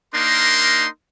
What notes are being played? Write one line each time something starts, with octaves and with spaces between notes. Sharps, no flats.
A#3 D4 D#4 A#4 C6